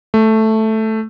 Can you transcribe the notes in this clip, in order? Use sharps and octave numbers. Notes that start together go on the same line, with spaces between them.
A3